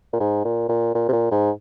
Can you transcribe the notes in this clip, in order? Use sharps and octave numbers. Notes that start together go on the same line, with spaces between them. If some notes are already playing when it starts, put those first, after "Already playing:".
A#2
G#2
A#2
A#2
A#2
C3
A#2
G#2